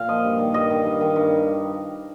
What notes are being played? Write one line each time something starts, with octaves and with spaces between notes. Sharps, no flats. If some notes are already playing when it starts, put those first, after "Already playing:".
Already playing: A#2 F5
F3 D#5
G2
D#3
G2 D#5
D#3
G2
D#3
G2